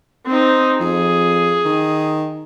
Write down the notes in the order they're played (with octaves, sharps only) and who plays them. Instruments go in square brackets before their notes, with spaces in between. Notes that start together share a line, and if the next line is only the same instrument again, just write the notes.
[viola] C4 D#4
[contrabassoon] F2 [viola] G#4
[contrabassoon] D#3